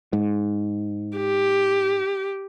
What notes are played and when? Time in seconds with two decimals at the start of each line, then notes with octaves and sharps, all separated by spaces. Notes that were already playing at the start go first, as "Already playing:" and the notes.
0.13 G#2
1.17 G4